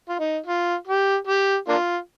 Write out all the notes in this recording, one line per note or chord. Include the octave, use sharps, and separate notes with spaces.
F4
D#4
F4
G4
G4
A#3 D4 F4